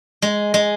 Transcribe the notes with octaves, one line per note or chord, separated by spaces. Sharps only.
G#3
G#3